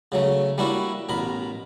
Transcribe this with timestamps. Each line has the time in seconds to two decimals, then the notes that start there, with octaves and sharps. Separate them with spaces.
0.12 C#3 F#3 A3
0.58 G3 A#3 D4 E4 F#4
1.09 A1 B2 A#4 B5